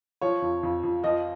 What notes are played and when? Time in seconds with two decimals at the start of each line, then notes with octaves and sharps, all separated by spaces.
0.21 F3 C#5
0.42 F2
0.63 F2
0.83 F2
1.04 F3 D#5